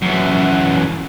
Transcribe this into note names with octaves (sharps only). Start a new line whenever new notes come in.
F#2 E3